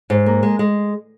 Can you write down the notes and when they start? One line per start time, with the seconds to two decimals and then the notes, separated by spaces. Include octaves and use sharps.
0.10 G#2
0.26 A#3
0.43 G#3
0.59 G#3